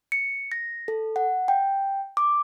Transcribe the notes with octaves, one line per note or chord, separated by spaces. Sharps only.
C#7
A#6
A4
F#5
G5
D6